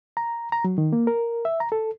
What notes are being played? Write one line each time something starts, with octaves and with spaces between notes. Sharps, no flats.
A#5
A#5
F#3
D#3
A#3
A#4
E5
A#5
A4